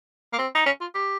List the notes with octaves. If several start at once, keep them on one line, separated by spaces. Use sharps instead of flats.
A#3
C4
D#4
C#4
F4
G4